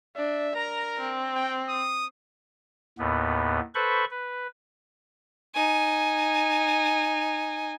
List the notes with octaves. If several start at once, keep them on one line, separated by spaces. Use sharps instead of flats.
D4 E5
A#4 A#5
C4
G5
D#6
D#2 A2 B3
A4 B4 C5 B5 C#6
B4
D#4 G#5